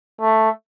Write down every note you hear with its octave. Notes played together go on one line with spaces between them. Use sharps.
A3